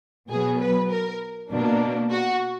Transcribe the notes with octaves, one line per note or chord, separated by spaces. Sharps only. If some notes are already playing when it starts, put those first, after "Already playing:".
B2 F#3 B3 G#4
B4
A#4
B2 A#3 D4
F#4